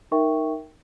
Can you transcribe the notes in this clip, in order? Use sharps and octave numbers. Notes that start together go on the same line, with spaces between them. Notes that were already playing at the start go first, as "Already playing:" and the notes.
D#4 A#4 E5 G5 C#6